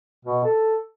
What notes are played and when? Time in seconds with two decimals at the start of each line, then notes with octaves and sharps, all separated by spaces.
0.25 B2
0.44 A4